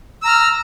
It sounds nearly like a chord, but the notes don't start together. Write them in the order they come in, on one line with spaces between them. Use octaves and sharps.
E6 A#5 F6